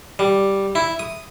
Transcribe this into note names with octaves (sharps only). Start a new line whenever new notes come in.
G3
E4
D#6